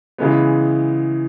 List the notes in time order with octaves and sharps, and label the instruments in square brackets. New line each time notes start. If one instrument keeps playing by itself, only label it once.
[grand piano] C#3 E3 G#3 B3